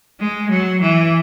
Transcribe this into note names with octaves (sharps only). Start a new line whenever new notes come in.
G#3
F#3
E3